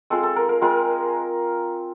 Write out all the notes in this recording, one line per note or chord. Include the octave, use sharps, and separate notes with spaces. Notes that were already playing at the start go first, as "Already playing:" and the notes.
G#3 C4 F4 A4
A4
A#4
A#4
G#3 C4 F4 A#4